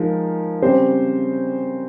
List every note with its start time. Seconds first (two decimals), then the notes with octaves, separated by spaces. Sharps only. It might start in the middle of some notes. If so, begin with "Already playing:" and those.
Already playing: F3 G#3 D#4 A#4
0.62 C#3 G3 C4 G4 C5